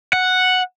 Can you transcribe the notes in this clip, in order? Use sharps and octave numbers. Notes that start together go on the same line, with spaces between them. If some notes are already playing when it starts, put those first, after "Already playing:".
F#5